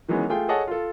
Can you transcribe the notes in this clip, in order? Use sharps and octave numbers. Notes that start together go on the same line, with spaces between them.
D#3 E3 F#3 G#3 B3 C#4
A3 F4 G#4 G5
G#4 A4 C#5 D#5 F#5 A5
F4 A4